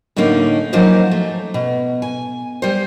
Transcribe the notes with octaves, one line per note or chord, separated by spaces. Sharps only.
A2 D3 A3 A#3 C#4 D#4
F3 F#3 A#3 C#4 D#4 C5
A3
B2
G#5
G3 C5